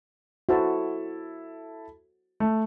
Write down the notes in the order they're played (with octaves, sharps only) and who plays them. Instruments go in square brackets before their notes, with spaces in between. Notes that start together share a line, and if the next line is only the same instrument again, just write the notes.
[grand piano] E4 A4 [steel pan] F#4 C5 A5
[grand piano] A3